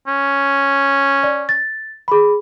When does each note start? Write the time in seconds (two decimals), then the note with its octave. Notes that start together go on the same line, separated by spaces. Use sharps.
0.07 C#4
1.24 D5
1.49 A6
2.08 G#4 B5